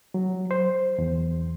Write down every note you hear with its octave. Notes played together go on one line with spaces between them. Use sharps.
F#3
C5
E2